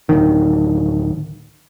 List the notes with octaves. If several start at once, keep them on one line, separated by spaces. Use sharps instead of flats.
D1 C2 D#3